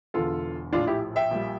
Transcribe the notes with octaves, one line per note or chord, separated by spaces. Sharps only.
E1 E2 D3 F4 A4
A#1 A2 F3 D4 F4
E4 G4
E5 G5
A#1 A#2 G3